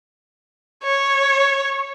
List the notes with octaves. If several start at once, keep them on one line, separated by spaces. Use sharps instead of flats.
C#5